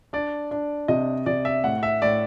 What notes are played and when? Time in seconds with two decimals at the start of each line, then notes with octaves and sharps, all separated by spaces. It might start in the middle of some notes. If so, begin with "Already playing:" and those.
0.13 D4 D5
0.51 D4
0.88 C3 D#5
1.26 C3 D5
1.45 E5
1.64 A2 F#5
1.83 E5
2.02 A2 D5